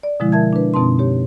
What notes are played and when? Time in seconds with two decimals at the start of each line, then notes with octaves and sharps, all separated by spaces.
0.03 D5
0.20 B2 D3 F3 G#3 E4
0.32 A#4 E5 A5 G#6
0.53 D4 B4
0.74 F#2 B2 C4 D#4 A5 C6
0.99 G4 C#5